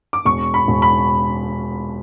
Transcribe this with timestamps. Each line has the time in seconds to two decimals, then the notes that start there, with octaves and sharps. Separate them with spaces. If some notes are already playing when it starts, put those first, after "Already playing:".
0.13 D6
0.25 E1 C#6
0.54 B5
0.68 E1
0.82 B5